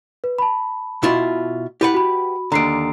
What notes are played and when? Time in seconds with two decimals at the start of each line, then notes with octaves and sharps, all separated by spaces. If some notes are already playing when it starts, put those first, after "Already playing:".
0.24 B4
0.38 A5 B5
1.03 B2 E4 F4
1.81 E4 G4 B4 F#5
1.94 F#4 B5
2.52 D#2 D3 A#5 C7 D7